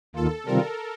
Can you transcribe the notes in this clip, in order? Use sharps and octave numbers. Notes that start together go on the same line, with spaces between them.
D#2 D#3 A#3 F4 A4
C3 D#3 G3 C4 F4 A#4